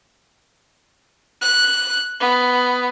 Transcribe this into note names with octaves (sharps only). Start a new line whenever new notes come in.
F#6
B3